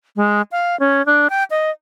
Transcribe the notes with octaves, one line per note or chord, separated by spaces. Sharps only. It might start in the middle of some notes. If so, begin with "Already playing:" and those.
G#3
F5
C#4
D4
G5
D#5